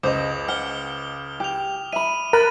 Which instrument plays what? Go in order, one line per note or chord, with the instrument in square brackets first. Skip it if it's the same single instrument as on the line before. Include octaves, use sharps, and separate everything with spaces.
[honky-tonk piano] C#2 [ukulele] C5 D#5 [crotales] D6 D#6 F7
[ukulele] F#5 [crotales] F6 G7
[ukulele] G4 [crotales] D6 F7
[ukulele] E5 B5 [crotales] D#7
[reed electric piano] A#4 [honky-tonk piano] B5 F#6 [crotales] A6